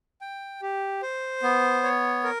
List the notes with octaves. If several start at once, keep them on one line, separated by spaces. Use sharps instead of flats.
G5
G4
C5
B3
C#5
A#4